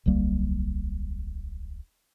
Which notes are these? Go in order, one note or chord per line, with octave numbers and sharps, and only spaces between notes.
D1 B1 G3 A#3